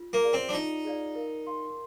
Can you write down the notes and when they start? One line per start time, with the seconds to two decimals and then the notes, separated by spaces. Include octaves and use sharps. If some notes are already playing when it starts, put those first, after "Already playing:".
Already playing: F4
0.13 A#3
0.24 G#4 D5 F5
0.33 C4
0.49 D4
0.53 D#4 F4
0.85 G#4 D5 F5
1.15 A#4
1.47 F5 C6